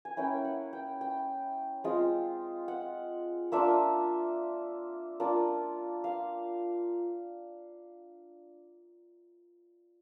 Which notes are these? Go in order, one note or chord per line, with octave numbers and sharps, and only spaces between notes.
G#5
A#3 C#4 E4 G5
F#5
G5
G5
G#3 C4 F4
F#5
A#3 D4 F4 E5
A#3 D4 F4
F5